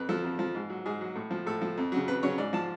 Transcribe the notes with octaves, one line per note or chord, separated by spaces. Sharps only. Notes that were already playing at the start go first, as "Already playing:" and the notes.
Already playing: F2 B4
F3 A4
F2
F3
G#2
F#3
G#2 G#4
F#3
A2
F3
A2 A4
F3
F2
C#3 F#3
F2 B4
C#3 F#3 C#5
G#2 D5
F3 A5